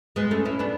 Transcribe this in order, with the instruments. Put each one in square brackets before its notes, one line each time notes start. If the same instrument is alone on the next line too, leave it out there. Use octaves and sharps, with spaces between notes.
[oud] G#3 B3
A3 C#4
C#4 E4
B3 D4